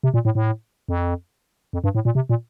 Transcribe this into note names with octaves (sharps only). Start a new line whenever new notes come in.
C3
A#2
A2
A2
F2
F2
G2
A2
A#2
C3
A#2